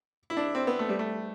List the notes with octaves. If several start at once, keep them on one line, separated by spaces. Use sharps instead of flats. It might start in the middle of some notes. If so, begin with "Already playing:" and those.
E4
D4
C4
B3
A3
G3
A3